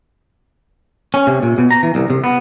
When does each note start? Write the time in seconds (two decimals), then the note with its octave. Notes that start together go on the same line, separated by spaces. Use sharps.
1.14 C#4
1.27 C3
1.43 A#2
1.58 B2
1.71 A#5
1.83 E3
1.95 C2
2.10 C3
2.24 B3